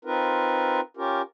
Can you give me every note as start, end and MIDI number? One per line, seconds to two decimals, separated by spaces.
0.05 0.81 60
0.05 0.81 63
0.05 0.81 65
0.05 0.81 70
0.05 0.81 71
0.97 1.22 61
0.97 1.22 65
0.97 1.22 67
0.97 1.22 70